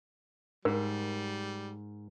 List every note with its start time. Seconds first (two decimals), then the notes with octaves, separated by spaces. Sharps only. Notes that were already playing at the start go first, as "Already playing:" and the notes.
0.65 G#2 G3 A#4